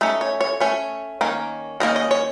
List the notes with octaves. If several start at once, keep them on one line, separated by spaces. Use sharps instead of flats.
A3 C#4 D#4
C#5
C#5
A3 C#4 C#5
D#3 A#3 C#4
D#3 A#3 C#4 D#5
D#5
C#5